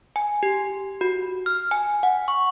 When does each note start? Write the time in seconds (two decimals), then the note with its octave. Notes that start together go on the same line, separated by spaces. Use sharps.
0.16 G#5
0.43 G4
1.01 F#4
1.46 F6
1.71 G#5
2.03 F#5
2.28 C#6